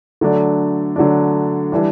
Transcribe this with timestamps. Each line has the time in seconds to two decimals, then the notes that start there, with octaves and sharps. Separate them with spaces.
0.21 D3 F#3 A3 D4
0.96 D3 F#3 A3 D4
1.72 E3 G3 D4